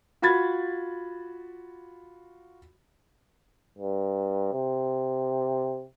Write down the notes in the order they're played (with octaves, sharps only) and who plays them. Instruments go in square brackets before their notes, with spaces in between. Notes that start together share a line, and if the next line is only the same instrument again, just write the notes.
[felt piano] F4 F#4 B5 G#6 A6
[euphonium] G2
C3